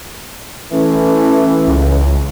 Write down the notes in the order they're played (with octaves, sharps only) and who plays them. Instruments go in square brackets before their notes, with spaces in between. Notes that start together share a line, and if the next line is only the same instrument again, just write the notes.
[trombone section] E3 A3 [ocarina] C#4
[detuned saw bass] C#2